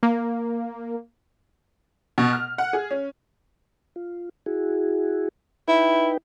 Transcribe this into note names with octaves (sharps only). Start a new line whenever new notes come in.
A#3
B2
F6
F#5
G#4
C#4
F4
E4 F#4 G#4
D#4 E4 B4 G5